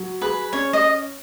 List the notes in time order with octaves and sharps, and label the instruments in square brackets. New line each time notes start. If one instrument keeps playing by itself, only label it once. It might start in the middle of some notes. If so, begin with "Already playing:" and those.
Already playing: [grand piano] F#3
[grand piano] G#4 [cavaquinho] B4
[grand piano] C#4 [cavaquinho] C#5
[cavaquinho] D#5